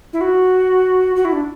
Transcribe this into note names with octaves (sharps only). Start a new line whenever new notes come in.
E4
F#4
F#4
E4
D4